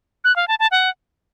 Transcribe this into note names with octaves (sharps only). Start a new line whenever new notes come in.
F#6
F5
A5
A5
F#5